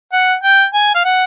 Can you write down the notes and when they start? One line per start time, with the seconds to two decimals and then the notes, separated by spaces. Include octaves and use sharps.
0.13 F#5
0.43 G5
0.74 G#5
0.95 F5
1.05 F#5